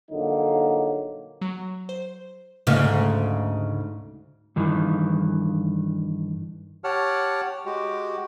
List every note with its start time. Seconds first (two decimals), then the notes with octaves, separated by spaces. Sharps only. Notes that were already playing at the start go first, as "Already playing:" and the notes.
0.11 A#1 D3 F#3 A#3 D#4
1.42 F#3
1.89 C5
2.67 D2 G#2 C#3
4.56 G2 D#3 E3
6.84 G4 C#5 F#5 A5 F6
7.66 G#3 F#4 G4